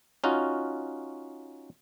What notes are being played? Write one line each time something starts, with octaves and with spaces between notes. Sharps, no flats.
C#4 D#4 F4 F#4